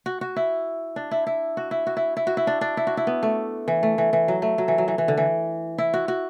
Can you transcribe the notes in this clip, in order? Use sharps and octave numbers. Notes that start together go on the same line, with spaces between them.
F#4
F#4
E4
D4
E4
E4
F#4
E4
F#4
E4
E4
F#4
E4
D4
D4
E4
F#4
E4
B3
A3
E3
A3
E3
E3
F#3
A3
F#3
E3
F#3
E3
E3
D3
E3
E4
F#4
F#4